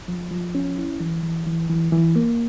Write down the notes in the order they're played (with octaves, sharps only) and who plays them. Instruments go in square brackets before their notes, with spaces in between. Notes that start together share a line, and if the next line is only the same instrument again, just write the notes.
[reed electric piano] F3
F3
C#4
E4
E3
E3
E3
E3
E3
A#3